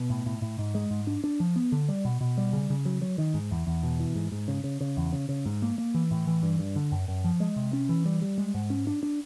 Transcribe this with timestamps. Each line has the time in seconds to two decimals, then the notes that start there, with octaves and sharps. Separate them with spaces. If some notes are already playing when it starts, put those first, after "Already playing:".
Already playing: B2
0.10 A2
0.26 A2
0.42 A2
0.59 G#2
0.75 G#3
0.91 G#2
1.07 D4
1.24 D4
1.40 F3
1.56 B3
1.72 D3
1.89 G3
2.05 B2
2.21 B2
2.38 G3
2.53 C#3
2.70 C#3
2.85 F#3
3.02 F#3
3.18 D#3
3.34 G#2
3.51 E2
3.67 E2
3.83 B2
4.00 E3
4.15 G#2
4.32 G#2
4.48 C#3
4.64 C#3
4.81 C#3
4.97 E2
5.12 C#3
5.29 C#3
5.46 G#2
5.62 A#3
5.78 A#3
5.94 E3
6.11 A2
6.27 E3
6.43 G2
6.59 G2
6.76 D3
6.92 F#2
7.08 F#2
7.24 F3
7.40 G#3
7.56 C3
7.73 C#4
7.89 E3
8.05 G3
8.22 G3
8.38 G#3
8.54 G#2
8.70 C#4
8.87 D4
9.03 D4